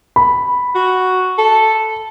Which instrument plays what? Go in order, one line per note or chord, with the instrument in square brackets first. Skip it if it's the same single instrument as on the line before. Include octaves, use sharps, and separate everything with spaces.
[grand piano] B5
[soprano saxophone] F#4
A4